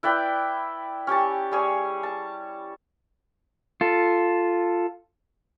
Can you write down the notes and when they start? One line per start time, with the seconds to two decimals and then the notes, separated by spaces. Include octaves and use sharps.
0.03 E4 B4 D5 G5
1.07 C#4 G4 C#5 A5
1.52 G3 G#4 C#5
2.03 A5
3.81 F4 A4